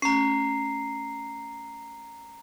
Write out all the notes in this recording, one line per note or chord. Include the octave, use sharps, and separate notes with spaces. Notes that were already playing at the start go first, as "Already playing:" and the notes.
A3 C#4 A#5 C7